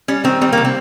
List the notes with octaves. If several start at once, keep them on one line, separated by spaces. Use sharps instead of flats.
G3 C#4
D#3 C4
G3 C4
C3 A#3
C4